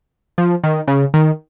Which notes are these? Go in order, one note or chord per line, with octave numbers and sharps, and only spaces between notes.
F3
D#3
C#3
D#3